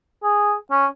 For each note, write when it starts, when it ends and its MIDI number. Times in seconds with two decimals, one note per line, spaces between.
0.23 0.54 68
0.71 0.86 61